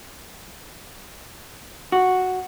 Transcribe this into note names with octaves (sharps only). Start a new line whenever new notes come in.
F#4